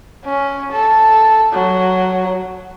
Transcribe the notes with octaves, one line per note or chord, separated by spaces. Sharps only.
C#4
A4
F#3